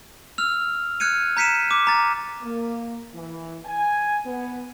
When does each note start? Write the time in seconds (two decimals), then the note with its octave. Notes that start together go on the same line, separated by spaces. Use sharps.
0.38 E6 F6 F7
1.00 F6 F#6 G#6 C#7 D#7
1.37 A#5 G6 B6 C#7 D#7 E7
1.71 D6
1.87 A#5 A6
2.42 A#3
3.14 E3
3.66 G#5
4.26 B3